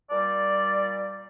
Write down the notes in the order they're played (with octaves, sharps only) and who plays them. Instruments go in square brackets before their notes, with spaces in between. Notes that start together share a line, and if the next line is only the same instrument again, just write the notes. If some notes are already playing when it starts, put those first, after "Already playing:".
[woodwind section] A#2 G3 D5